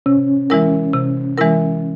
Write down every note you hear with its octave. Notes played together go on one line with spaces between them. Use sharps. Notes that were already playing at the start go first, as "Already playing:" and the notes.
C3 C#4
E3 G#3 E4 A#4
C3
E3 G#3 E4 A#4